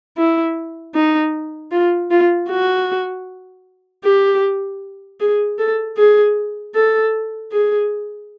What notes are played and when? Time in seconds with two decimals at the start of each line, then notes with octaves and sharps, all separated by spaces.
0.17 E4
0.95 D#4
1.72 F4
2.11 F4
2.49 F#4
4.04 G4
5.20 G#4
5.59 A4
5.97 G#4
6.75 A4
7.52 G#4